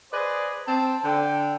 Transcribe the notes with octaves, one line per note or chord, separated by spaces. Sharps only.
G#4 B4 C5 D5 D#5
C4 A5
D3 G5